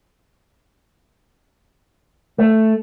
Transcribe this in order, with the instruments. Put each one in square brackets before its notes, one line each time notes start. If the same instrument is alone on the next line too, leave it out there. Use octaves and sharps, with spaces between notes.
[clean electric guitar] A3